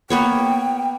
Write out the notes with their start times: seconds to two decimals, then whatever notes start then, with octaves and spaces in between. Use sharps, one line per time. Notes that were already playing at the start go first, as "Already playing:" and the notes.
0.10 A#3 B3 C#5 G5